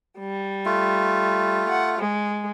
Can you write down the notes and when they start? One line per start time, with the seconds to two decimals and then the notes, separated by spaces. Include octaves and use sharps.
0.20 G3
0.65 A3 F4
1.69 F#5
1.99 G#3